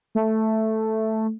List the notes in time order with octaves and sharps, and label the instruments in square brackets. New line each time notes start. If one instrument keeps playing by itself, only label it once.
[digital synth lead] A3